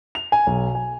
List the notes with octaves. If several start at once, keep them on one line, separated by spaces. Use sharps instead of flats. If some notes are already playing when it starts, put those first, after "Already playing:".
F7
G#5
B1
G#5